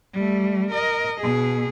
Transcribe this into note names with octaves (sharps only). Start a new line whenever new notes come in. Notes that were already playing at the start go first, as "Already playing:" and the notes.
G3 A3
A#4 D#5
B2 G#4